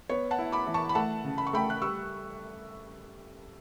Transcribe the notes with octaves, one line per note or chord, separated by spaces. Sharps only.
B3 C#5
F#5 A5
E4
B5 D6
E3
A5 C#6
B5
A3 F#5 A5
C#3
B5
C#6
A3 G5 B5
F#6
G3 C#6 E6